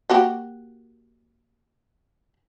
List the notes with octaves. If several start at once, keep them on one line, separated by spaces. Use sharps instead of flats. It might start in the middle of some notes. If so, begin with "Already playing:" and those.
A#3 F#4 G4